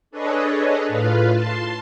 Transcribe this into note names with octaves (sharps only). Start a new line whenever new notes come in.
D4 G#4 A4 B4 C#5 D#5
A2 F4 B4 F5
A5 C6